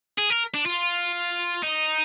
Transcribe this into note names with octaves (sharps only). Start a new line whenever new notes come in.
G#4
A#4
D4
F4
D#4